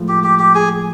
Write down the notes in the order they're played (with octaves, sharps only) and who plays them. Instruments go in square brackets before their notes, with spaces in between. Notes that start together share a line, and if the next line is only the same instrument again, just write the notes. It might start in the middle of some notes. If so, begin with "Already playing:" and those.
Already playing: [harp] A2 F3 G#3 F4
[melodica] G4
G4
G4
G#4